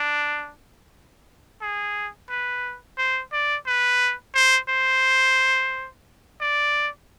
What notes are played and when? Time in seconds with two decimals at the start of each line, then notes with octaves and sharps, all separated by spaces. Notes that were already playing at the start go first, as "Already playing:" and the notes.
Already playing: D4
1.61 G#4
2.29 B4
2.98 C5
3.32 D5
3.66 B4
4.34 C5
4.69 C5
6.41 D5